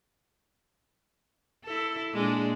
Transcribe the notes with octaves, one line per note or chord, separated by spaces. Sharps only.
E4 A4
A#2 G#3 D4